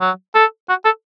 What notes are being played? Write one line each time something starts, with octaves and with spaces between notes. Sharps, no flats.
F#3
A4
F#4
A4